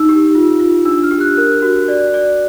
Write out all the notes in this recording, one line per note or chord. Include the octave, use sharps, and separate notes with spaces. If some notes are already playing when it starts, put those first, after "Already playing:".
Already playing: D#4 E6
G4
F4
F4
D4 E6
F6
G4
F#6
A#4 F#6
F#4
D5
D5